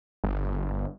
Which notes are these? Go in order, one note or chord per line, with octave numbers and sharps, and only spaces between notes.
G1